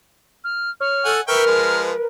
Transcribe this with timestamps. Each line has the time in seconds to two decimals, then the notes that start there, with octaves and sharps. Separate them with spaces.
0.44 F6
0.80 C#5 F6
1.05 A4 F#5 G#5
1.28 A#4 B4 E5 G5 C#6 F6
1.47 F3 G#3